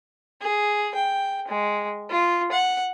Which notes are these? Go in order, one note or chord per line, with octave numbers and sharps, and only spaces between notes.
G#4
G5
G#3
F4
F#5